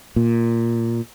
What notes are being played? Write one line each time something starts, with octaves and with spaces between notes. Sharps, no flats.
A#2